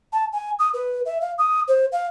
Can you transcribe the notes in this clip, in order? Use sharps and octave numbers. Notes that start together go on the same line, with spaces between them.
A5
G#5
D#6
B4
E5
F5
D#6
C5
F5